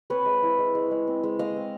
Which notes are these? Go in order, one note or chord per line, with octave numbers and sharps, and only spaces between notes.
C4 B4 C#5
G#3
E4
G#3
G#3
G#3
C4
G#3
G#3 D#5 F5
C4